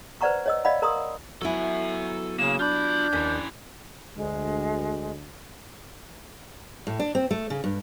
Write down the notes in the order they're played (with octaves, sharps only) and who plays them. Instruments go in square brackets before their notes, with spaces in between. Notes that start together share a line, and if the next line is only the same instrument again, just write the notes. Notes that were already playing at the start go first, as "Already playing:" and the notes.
[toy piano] B4 C5 D5 F#5 A#5 C#6
C#5 D#5 E6
D5 D#5 F5 F#5 B5
A#4 A#5 C6 D#6
[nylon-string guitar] F#3 B3 E4 [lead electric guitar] A4 G#5
[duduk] C#3 [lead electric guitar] A#3 [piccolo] E7
[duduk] D4 [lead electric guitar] F4 B5 [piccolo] G6
[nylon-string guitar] D#2 [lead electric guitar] C#4 E4
[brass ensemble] D2 [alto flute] G#3
[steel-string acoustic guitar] A2
D4
C4
A3
C#3
G2